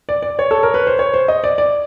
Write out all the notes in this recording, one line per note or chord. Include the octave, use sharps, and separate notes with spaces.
D5
D5
C#5
A4
A#4
B4
C5
C#5
C5
D#5
D5
D5